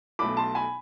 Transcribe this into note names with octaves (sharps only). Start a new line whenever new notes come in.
B1 B2 A3 B5 D6
A5 C6
G#5 B5